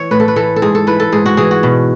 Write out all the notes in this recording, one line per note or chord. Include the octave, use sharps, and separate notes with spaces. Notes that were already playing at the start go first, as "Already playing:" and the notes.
Already playing: E3 C#5
A2 B4
A4
B4
E3 A4
A4
G#2 G#4
A4
E3 B4
A4
G#2 G#4
F#4
E3 G#4
F#4
B2